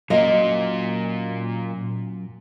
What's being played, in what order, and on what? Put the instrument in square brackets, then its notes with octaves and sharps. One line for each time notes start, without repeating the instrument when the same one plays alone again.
[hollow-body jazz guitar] F#2 [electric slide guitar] A#2 A#3 [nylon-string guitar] D#5 F5